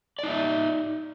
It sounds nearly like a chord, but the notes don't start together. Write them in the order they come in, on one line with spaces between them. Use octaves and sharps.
D5 D#4 E5